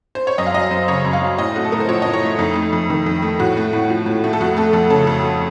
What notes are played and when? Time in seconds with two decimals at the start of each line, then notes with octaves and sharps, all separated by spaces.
0.15 C5
0.27 C#5
0.38 F#2 D#5
0.46 F5
0.54 F#3 D#5
0.71 F#2 C5
0.88 C#3 C#5
1.05 F#2
1.13 F5
1.22 F#3
1.38 A2 D#5
1.55 A3 F#4
1.65 A4
1.72 A2 A#4
1.80 C5
1.89 F3 C#5
2.02 A2 D#5
2.13 C#5
2.23 A3
2.39 F2 D#4
2.55 A3
2.73 F2
2.90 D#3
3.06 F2
3.22 A3
3.39 A2 F#4
3.57 A3
3.73 A2
3.90 F3
4.06 A2
4.24 A3
4.33 A4
4.40 F2 F#4
4.57 A3 A4
4.73 F2 A4
4.90 C#3 A4
5.07 F2
5.24 A3